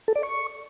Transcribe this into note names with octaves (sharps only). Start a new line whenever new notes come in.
A4
D5
C#6